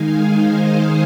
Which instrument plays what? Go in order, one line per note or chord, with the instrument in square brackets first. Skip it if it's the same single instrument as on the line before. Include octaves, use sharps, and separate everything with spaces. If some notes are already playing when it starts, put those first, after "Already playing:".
Already playing: [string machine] D#3 G#3 D#4 F5 G#5
C5 D#5